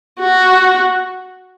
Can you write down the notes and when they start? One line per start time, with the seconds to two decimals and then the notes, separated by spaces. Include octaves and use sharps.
0.20 F#4